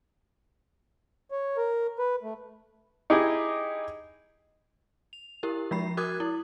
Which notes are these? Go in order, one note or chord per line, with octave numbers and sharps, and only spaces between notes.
C#5
A#4
B4
A3
D#4 E4 G4 G#4 D#5
F7
E4 G4 A#4
F3 G#3 B5 C7
F#4 A#4 D6 D#6 F#6 G#6
E4